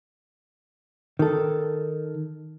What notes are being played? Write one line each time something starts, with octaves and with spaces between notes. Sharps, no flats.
D#3 A4